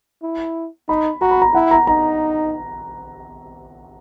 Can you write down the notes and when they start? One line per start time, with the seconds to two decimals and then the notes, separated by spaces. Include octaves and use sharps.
0.23 E4
0.89 D#4 B5
1.21 F#4 A#5
1.31 B5
1.42 A#5
1.54 E4 F#5
1.71 A#5
1.87 D#4 A#5